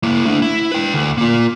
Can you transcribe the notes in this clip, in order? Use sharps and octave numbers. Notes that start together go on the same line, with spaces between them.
A#3 E4
A3 D4
E4
B4 G5
D2
A#3 F4